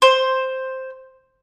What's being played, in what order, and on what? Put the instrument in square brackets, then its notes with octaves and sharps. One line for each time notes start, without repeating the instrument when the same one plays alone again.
[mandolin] C5